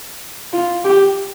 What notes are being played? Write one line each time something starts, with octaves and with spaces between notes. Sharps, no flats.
F4
G4